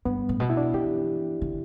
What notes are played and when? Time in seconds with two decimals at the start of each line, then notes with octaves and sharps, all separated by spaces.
0.05 G2 B3
0.29 A2
0.40 B2
0.50 E4
0.57 D4
0.74 E3 G4
1.42 D3